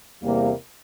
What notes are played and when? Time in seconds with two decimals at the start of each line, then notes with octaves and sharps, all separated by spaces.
0.22 E2 C3 G3 A#3